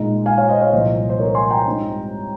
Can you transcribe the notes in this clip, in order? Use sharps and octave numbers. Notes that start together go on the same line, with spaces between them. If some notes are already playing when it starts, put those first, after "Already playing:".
Already playing: A#2 G#3 D#4
F5 G#5
C#5 F5
C5 D#5
C#5 F5
C2 A#2 F3 C5 D#5
C5
A#4 C#5
G#5 C6
G5 A#5
G#2 G3 C4 D#4